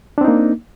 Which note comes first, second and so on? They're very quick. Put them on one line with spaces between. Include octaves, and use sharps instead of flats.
D4 C4 D#4 A#3